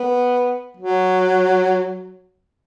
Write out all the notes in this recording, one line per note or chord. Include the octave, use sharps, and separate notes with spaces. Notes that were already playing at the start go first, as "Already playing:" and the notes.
Already playing: B3
F#3